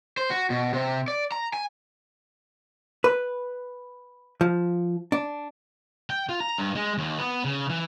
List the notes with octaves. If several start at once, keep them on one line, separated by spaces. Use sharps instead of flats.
C5
F#4
B2
C3
D5
A#5
G#5
B4
F3
D4
G5
F4
A#5
G2
G#3
D#2
B3
C#3
E3